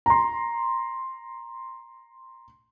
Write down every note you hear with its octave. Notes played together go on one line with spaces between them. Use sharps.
A#5 C6